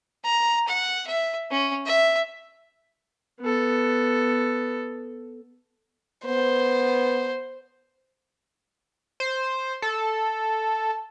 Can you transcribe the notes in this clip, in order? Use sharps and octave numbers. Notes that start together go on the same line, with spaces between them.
A#5
F#5
E5
C#4
E5
B3 A4
B3 C5
C5
A4